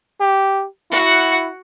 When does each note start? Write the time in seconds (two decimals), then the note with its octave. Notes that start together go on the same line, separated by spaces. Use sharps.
0.20 G4
0.91 E4 F#4 F#5